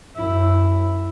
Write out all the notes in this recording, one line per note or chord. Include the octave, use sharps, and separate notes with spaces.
F#2 E4